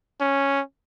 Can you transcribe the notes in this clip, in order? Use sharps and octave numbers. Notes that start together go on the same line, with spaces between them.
C#4